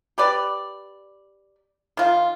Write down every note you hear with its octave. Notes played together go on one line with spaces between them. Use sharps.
G4 B4 D5
D#3 F4